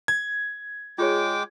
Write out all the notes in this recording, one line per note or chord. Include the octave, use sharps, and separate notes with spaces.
G#6
G#3 F4 G#4 C#5 G5 D6